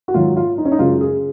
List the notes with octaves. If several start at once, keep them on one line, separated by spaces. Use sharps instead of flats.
F#4
G#2 D#3 F#3 F4
F4
D#4
C#4
D#4
F#2 C#3 G#3 F4
G#4